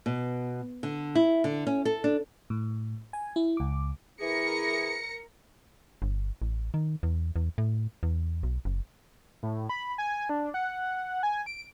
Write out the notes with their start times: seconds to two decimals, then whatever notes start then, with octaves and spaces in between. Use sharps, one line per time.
0.06 B2
0.83 D3
1.15 E4
1.44 D3
1.67 C#4
1.85 A4
2.04 D4
2.50 A2
3.13 G#5
3.36 E4
3.57 C#2 D6
4.21 E3 E4 G#4 A#4 A#6 C#7
6.02 G1
6.42 A1
6.74 D#3
7.03 E2
7.36 E2
7.58 A2
8.03 E2
8.43 B1
8.65 F#1
9.43 A2
9.69 B5
9.98 G#5
10.29 D4
10.54 F#5
11.23 G#5
11.46 D7